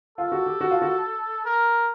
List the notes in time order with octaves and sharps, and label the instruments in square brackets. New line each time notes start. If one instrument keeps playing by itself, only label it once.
[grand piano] F4 [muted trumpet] A4
[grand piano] F#4
G4
F#4
F4
F#4
[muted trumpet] A#4